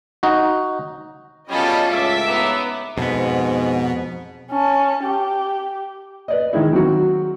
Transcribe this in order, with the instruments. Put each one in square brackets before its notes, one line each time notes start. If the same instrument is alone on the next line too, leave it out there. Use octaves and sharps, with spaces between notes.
[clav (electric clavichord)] D#4 F#4
[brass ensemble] B2 F#3 G3 [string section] C#4 D#5 [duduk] F4 [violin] G#4 A4
[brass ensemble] C#2 A2 E5 [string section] D6 E6
[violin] B3 D#4
[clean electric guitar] F2 B3 [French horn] G#2 [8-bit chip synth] B2
[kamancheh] C#4 A5
G4
[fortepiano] B4 D5 D#5
D#3 G#3 E4
D#3 F#3 C4 F#4